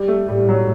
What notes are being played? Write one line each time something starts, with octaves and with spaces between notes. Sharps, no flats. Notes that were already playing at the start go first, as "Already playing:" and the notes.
Already playing: G3
A3
A2 G3
F#3